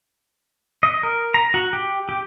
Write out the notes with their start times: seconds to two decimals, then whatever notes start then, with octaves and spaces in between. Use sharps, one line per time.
0.83 D#5
1.03 A#4
1.34 A#5
1.54 F#4
1.73 G4
2.09 G4